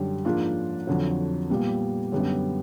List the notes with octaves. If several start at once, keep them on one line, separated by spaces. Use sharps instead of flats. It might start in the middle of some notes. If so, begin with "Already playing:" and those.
Already playing: F#2 D3 G3
G#2 F3 A#3 D4 F4
F2 D3 F#3
A#2 G3 B3
F#2 D3 G3 B3